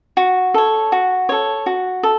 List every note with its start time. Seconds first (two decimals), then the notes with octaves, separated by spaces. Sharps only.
0.17 F#4
0.54 A4 C#5
0.92 F#4
1.29 A4 C#5
1.66 F#4
2.03 A4